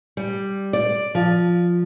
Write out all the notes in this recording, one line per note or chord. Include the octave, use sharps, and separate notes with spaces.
G3
D5
F3